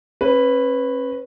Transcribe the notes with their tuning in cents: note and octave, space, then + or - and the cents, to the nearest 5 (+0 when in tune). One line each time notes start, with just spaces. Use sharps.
C#4 -40 B4 +0